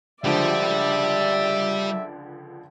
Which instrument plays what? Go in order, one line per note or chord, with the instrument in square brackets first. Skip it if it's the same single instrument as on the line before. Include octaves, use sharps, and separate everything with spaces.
[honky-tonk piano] C#2 D3 F3 [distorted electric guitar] G3 [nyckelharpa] D5 [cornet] E5